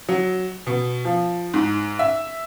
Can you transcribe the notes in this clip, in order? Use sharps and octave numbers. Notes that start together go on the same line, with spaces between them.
F#3
B2
F3
G#2
E5